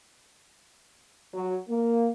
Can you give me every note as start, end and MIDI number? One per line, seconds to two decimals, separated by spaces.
1.34 1.58 54
1.68 2.10 58